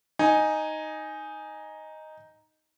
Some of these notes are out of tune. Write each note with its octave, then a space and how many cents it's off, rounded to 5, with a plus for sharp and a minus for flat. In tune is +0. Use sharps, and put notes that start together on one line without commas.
D#4 +0 G#5 +0